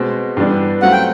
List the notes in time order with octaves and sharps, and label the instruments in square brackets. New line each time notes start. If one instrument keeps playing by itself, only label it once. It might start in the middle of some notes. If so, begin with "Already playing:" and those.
Already playing: [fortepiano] B2 G#3 C4
G2 E3 G3 B3 D4
[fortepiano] F#3 A3 C4 F4 [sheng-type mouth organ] F#5
[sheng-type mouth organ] G5